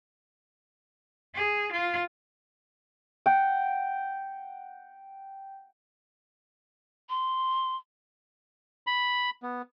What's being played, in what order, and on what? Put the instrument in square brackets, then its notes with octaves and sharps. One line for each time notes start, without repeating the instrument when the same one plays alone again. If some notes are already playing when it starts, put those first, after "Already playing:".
[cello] G#4
F4
[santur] F#5 G5
[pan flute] C6
[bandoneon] B5
B3